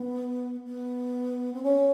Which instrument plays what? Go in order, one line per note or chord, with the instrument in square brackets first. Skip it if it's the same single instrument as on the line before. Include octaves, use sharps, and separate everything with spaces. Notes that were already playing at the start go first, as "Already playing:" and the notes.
Already playing: [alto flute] B3
B3
C4
C#4